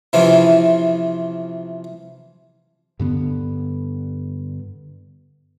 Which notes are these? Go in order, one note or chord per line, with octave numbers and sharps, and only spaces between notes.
C3 E3 F3 C4 C#4
G2 D3 B3